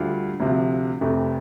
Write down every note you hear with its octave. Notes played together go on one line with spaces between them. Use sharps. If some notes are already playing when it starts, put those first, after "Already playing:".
Already playing: D2 D3 G3 F4
D2 C3 F3
F1 F2 C3 A3